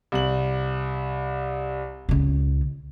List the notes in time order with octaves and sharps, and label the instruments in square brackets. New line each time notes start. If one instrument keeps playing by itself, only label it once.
[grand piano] C2 F#7
[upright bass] C#2 C#3